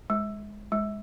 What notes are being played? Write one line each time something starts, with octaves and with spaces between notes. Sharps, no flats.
G#3
G#3